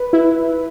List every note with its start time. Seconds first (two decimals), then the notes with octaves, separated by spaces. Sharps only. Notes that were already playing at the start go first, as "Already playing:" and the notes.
Already playing: B4
0.13 E4